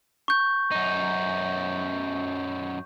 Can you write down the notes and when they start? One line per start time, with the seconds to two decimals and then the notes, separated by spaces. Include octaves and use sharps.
0.28 C#6 G6
0.72 F#2 D#4